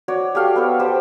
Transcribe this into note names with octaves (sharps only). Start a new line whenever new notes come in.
F#4 C#5 D5
G4 A4 F5 G5
B3 A4 C#5
G4 C5